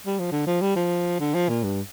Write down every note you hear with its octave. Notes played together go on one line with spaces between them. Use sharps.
G3
F3
D3
F3
G3
F3
D3
F3
A#2
G2